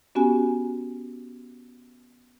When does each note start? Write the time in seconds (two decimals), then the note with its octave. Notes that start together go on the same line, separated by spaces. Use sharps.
0.15 B3 C#4 F#4 G4 G#5